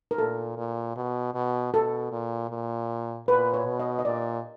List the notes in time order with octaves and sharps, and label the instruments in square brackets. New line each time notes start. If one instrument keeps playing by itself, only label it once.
[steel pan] A#4
[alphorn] A#2 [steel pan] A4
[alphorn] A#2
B2
B2
[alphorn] B2 [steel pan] A4
[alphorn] A#2
A#2
[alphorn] A#2 [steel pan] B4
[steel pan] C#5
[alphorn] B2
[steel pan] D#5
D#5
[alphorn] A#2 [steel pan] D5